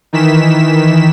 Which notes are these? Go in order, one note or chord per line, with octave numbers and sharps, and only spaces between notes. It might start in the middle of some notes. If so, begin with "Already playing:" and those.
D#3 E3 B6 E7